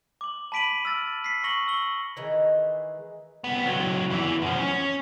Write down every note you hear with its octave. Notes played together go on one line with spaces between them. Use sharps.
D6 F#7
A5 B5 B6 D7 D#7 F#7
E6 F6 A6
B6 C7
C#6 A#6 C#7 F#7
E6 G7
D#3 E3 G#3
C2 B3
C#2 F#3
E2 E3
F#2 F3
C#4